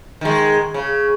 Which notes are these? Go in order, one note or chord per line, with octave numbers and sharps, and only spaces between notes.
D#3 G#3
C#3